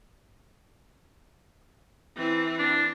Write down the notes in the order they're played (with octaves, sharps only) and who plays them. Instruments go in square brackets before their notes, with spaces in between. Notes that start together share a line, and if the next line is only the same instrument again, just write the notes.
[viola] E3 C4
[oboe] D4